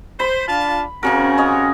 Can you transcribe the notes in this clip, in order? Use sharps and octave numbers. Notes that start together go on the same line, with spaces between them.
C5 B5
D4 F4 A5
C#3 C4 C#4 F#4 G4 A#4
C#5 D#5 G#5